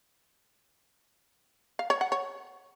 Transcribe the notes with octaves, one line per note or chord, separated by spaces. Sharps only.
F5
C#5
F#5
C#5